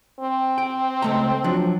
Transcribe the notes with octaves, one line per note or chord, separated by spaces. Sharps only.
C4
G5
C#2 A3 A#5
F3 F#3 D4